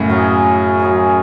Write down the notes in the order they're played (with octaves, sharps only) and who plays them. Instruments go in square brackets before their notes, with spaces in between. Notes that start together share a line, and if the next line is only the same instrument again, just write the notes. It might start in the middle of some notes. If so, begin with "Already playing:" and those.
Already playing: [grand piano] F#2 A2 C#3
[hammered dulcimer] F#3 C#4 G#4
F#3 C#4 G#4